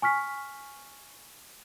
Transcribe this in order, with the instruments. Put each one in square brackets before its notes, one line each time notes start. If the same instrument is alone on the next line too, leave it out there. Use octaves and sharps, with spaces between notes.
[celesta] G#5 C#6 F6 B6